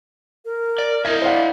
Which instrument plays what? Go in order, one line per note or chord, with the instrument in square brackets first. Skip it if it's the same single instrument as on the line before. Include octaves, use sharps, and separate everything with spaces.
[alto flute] A#4
[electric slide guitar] D5
[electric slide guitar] E4 D#5 E5 [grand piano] G#6
[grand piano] C5 F5 F#5 [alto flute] D5